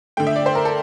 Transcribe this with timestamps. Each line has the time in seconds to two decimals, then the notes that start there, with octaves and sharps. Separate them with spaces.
0.17 D3 A3 G5
0.27 E5
0.36 D5
0.46 C5
0.55 A#4
0.65 A4